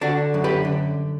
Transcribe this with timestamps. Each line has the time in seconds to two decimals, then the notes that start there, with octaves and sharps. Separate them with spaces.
0.01 D3 D4 F#4
0.34 F#2
0.44 G4 B4
0.65 D3